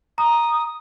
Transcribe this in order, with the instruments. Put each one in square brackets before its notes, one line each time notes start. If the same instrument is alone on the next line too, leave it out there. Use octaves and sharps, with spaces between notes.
[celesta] A#5 [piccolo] D#6